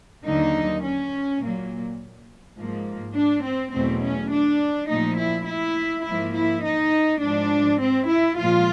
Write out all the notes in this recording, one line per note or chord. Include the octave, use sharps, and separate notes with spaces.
D#2 D3 F#3 A#3 D#4
C#4
A#2 F#3 A#3
G#2 F3 A#3
D4
C4
E2 B2 F#3 A3 C4
C#4
D4
A#2 F3 A3 D#4
E4
E4
G#2 F3 A#3 E4
E4
D#4
G#2 F3 G#3 D4
C4
E4
A#2 F3 G#3 F4